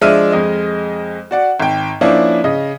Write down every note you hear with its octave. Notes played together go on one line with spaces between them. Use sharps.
F3 G#3 D4 E5 F6 D#7
F2 G#3 D#5
F#4 D5 F#5
G#1 G5
F3 A#3 C#4 D4 E4
C#3 D#5